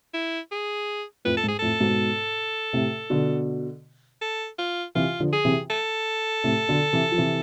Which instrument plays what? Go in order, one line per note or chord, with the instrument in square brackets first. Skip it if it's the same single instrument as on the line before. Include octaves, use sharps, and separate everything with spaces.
[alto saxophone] E4
G#4
[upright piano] F2 A2 [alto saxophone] B4
[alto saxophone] A4
[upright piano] G#2
[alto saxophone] G#4
[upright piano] F2 A2 [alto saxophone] A4
[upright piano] G#2 B2
A2 C3
B2 D3
[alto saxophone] A4
F4
[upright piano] C3 E3 [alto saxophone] F4
[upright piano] D3 F3
[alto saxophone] G#4
[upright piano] C3 E3
[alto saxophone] A4
[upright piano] A2 C3
B2 D3
C3 E3
F3
C3 E3